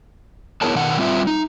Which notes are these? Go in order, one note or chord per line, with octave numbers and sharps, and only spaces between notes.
B3 E4 G#4 A#4 C#5 A5
B2 D#3 F#5
G3 C4 F4 E5
D#4